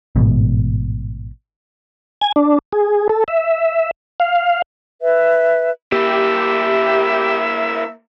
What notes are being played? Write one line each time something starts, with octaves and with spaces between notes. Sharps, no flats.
A1 G#2 B2
G#5
D4
G#4
A4
E5
F5
B4 E5
A#3 E4 G4 E5